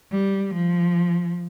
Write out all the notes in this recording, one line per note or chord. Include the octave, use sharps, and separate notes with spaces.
G3
F3